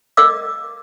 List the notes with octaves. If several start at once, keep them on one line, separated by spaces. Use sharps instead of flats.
A#4 D5 D#5 F5 D6 E6